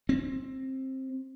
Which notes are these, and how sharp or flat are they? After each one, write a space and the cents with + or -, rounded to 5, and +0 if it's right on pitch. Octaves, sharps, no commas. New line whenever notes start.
C4 +15